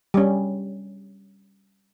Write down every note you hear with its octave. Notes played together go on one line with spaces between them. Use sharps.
G3 C#4